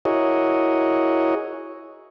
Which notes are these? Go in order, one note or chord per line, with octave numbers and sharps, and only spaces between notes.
E4 F#4 G#4 A#4 C#5 D#5